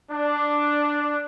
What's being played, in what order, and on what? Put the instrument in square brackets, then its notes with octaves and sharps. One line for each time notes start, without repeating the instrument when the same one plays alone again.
[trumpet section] D4